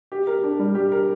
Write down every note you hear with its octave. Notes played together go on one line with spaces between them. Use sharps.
G4
A#4
D4
G3
G4
A#4